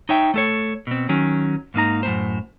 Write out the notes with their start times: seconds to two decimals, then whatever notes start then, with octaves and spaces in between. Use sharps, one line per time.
0.09 D#4 C#5 E5 G5
0.34 A3 A4 C#5
0.87 B2 C4
1.09 D#3 F#3 C#4
1.74 G#2 A#3 D#4 A#5
2.03 F#2 A2 C5